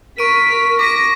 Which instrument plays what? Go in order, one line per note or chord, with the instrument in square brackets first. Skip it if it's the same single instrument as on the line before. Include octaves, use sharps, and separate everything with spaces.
[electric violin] A#4 B6 [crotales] C#6 D7 D#7
[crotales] D6 B6 D#7 [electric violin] A#6